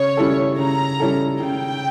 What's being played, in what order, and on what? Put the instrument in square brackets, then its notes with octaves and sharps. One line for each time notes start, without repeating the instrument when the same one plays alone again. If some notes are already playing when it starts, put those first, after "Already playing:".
Already playing: [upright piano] C#3 [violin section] C#5
[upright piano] G3 C#4 E4 A4
[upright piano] C#3 [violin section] A#5
[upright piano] G3 C#4 E4 A4
[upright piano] C#3 [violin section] G5